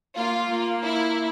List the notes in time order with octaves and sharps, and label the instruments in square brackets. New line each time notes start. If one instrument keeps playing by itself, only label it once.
[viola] A#3 [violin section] F4
[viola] A#3
[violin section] E4